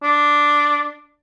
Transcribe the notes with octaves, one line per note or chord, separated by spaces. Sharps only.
D4